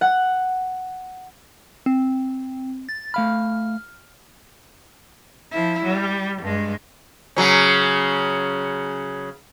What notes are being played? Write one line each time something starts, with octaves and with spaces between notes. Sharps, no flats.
F#5
C4
A6
A3 F5 B5 F6
F3 E4
G3
G2 G#3
C#3 F#3 C#4